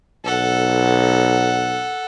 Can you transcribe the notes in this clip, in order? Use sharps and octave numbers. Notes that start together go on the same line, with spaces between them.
B1 A4 F#5